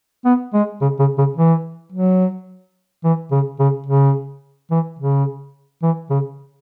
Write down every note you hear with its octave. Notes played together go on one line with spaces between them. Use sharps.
B3
G#3
C#3
C#3
C#3
E3
F#3
E3
C#3
C#3
C#3
E3
C#3
E3
C#3